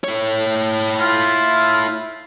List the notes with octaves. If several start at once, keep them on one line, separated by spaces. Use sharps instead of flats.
E4 C#5
F4